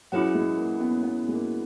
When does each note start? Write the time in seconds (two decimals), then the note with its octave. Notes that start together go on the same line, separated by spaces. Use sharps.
0.12 F#3 C#4 E4 G#4 B4 F#5
0.35 G#3
0.57 A#3
0.80 B3
1.03 B3
1.28 G#3
1.33 A#3